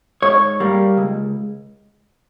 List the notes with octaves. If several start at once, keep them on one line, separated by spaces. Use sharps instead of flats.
G#2 C#5
G3 A#3
C#2